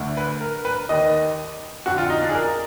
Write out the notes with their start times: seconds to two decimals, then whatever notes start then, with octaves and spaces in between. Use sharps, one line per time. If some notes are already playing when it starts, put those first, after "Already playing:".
Already playing: D2 D3
0.17 B4
0.41 A#4
0.65 B4
0.89 D#2 D#3 D#5
1.86 F2 D3 F#4
1.98 F4
2.10 D#4
2.22 D4
2.29 G#4
2.35 A#4